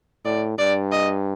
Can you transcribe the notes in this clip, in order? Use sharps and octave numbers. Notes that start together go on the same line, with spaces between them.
A2 D5
G2 D5
D#5